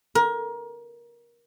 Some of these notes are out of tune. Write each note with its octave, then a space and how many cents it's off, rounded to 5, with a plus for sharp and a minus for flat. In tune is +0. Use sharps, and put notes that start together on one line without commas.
A#4 +25